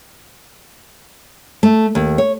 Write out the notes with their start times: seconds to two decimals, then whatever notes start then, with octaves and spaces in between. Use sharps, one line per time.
1.63 A3
1.95 D#2
2.18 C#5